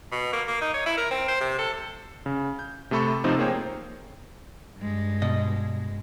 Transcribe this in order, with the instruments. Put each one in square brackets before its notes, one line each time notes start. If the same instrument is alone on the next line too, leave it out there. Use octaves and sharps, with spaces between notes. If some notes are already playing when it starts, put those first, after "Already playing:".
[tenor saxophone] B2
A#3
A#3
D#4
C#5
E4
A#4
C4
C5
C3
A4
[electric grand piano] C#3
G6
C3 A3 A4 B5 C#6
C3 F3 A3 C4 D#4 C5
A#3 G#4 C5 C#5 G5
[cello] G2 G#3
[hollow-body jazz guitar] B2 D#5